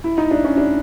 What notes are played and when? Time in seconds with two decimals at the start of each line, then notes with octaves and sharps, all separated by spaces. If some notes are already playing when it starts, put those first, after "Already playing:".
0.04 E4
0.18 D#4
0.31 D4
0.44 C#4
0.57 D4